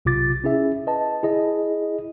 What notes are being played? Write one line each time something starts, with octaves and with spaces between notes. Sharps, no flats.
B1 C3 F4 D6 A6
C#4 E4 G#4 E5
B4 D#5 A5
E4 G#4 D#5